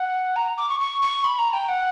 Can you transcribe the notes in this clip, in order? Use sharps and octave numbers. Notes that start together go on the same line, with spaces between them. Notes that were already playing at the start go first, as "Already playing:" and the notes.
Already playing: F#5
A#5
D6
C#6
C#6
C#6
B5
A#5
G5
F#5